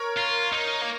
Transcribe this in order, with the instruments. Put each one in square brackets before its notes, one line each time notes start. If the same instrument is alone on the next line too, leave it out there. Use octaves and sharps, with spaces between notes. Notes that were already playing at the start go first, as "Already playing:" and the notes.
Already playing: [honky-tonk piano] A#4 C#5
[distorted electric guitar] F4
D#4
A#3